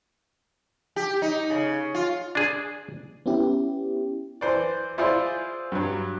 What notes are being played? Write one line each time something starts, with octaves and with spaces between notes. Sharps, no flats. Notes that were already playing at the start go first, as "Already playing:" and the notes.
G4
D#4
C#3
F4
D4 G#4
B3 C#4 E4 G4
E3 C5 D5
E4 F4 G#4 C5 D5
G2 F#3